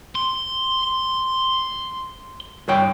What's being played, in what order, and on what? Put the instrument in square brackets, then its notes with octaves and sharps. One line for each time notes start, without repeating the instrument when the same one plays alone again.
[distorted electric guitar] C6
[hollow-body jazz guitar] G2 C#5 G5